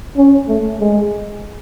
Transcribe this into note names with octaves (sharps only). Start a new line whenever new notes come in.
C#4
A3
G#3